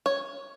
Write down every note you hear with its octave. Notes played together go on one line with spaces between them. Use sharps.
C#5